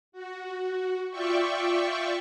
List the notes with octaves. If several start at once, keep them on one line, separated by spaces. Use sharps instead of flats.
F#4
F4 D5 E5 G5 C#6